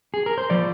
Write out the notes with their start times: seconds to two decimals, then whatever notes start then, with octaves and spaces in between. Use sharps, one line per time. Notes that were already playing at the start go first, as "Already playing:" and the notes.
0.14 G#4
0.26 A#4
0.38 C5
0.50 F3 D5